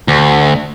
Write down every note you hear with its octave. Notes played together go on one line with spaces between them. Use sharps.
D2